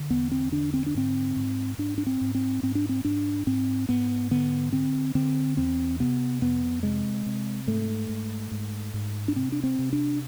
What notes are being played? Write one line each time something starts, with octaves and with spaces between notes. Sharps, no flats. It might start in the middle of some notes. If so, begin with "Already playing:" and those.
Already playing: D3
E2 B3
C4
D3 D4
C4
D4
G#2 C4
G#2
G#2 D4
D4
C4
G#2
C4
G#2 C4
D4
C4
G#2 D4
G#2 C4
G#2 B3
D3 B3
D3 C4
D3 C4
E2 C4
C3 B3
F2 B3
C3 G#3
C3
G#2 A3
G#2
G#2
G#2
D4
C3 C4
D4
C4
C3
D4